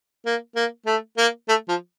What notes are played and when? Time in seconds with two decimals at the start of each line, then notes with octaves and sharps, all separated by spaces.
0.25 A#3
0.55 A#3
0.86 A3
1.17 A#3
1.48 A3
1.68 F3